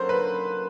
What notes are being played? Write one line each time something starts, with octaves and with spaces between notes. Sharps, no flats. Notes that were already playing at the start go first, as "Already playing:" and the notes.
Already playing: F#3 A#3 C#4 F#4 A4 C5
B4